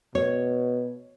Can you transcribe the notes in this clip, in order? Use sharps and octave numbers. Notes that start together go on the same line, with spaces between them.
B2 C#5